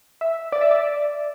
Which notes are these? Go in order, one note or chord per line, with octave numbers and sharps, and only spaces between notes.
E5
D5
E5
D5